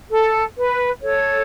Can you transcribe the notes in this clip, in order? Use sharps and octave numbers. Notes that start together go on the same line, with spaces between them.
A4
B4
A4 C#5